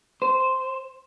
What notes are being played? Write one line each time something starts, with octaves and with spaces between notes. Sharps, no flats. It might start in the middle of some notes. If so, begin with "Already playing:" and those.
C5